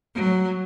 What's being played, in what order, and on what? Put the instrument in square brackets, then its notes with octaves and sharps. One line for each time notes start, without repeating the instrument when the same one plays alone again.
[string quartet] F#3